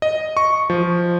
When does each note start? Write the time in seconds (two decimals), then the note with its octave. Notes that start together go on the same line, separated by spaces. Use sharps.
0.02 D#5
0.37 C#6
0.70 F3